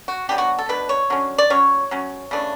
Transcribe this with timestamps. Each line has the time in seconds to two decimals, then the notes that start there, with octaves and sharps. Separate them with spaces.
0.08 F#4
0.29 F#3 B3 D4 G4
0.38 F#4
0.59 A4
0.69 B2 A3 D4 B4
0.89 C#5
1.10 D3 F#3 C#4
1.38 D5
1.50 F#3 C#4 C#5
1.91 F#3 C#4
2.31 C#3 E3 A3 D4